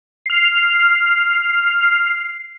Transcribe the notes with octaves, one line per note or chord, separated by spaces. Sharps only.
F6 C7